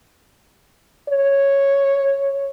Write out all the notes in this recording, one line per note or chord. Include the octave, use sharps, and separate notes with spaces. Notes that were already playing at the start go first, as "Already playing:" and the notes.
C#5